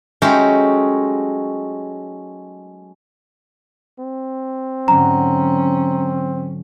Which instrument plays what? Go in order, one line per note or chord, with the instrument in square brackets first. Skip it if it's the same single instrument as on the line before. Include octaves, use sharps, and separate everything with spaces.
[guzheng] F#3 G#3 A3 C#4 D#4 G4
[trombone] C4
[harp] G#2 D3 F#3 [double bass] C#4 [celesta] A#5